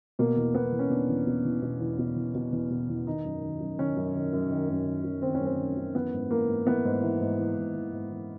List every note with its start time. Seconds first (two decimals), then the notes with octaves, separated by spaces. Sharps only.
0.19 B2 A#3
0.36 E2
0.54 B2 B3
0.72 E2
0.79 C#4
0.90 B2 D4
1.09 E2
1.27 B2
1.45 E2
1.62 B2
1.80 E2
1.98 B2
2.16 E2
2.35 B2
2.52 E2
2.70 B2
2.89 E2
3.07 D#3 D#4
3.25 F#2
3.42 D#3
3.60 F#2
3.78 D#3 C#4
3.97 F#2
4.15 D#3
4.33 F#2
4.50 D#3
4.69 F#2
4.86 D#3
5.04 F#2
5.22 D#3 C4
5.35 C#4
5.41 F#2 C4
5.58 D#3
5.77 F#2
5.95 E3 B3
6.13 G#2
6.31 E3 A#3
6.48 G#2
6.66 E3 B3
6.85 G#2
7.03 E3
7.21 G#2
7.38 E3
7.57 G#2
7.74 E3
7.93 G#2
8.10 E3